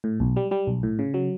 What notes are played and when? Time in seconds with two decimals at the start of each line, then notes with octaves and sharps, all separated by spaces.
0.04 A2
0.20 B1
0.36 G3
0.51 G3
0.67 B1
0.83 A2
0.99 C#3
1.14 F#3